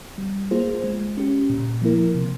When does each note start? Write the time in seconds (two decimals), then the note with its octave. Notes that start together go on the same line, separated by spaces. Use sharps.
0.18 G3
0.51 A#3 F4 G#4 C5
0.84 G#3
1.17 C#4 G4
1.50 A#2
1.82 F3 A#3 E4 A#4
2.15 C3